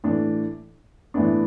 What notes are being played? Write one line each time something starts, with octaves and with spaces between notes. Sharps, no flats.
A2 E3 A3 D4
A2 E3 B3 D4